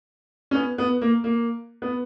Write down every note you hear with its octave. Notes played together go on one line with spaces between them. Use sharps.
C#4
B3
B3
A#3
A#3
B3